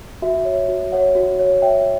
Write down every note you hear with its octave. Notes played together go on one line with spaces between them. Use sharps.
F#4 E5
C#5
F#4
C#5 F#5
F#4
C#5
C#5 E5 G5